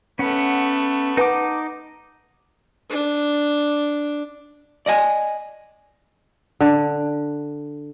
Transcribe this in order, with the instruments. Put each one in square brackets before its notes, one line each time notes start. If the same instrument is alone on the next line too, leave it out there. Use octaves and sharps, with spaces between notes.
[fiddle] A3 B3 [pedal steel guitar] C#4 F#5
[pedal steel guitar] D#4 D6 [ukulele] B4 F#5 A5
[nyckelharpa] D4
[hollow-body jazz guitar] D5 D#5 F#5 G#5
[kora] D3